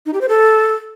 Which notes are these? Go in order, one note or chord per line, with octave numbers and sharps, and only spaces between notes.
D#4
G4
C5
A4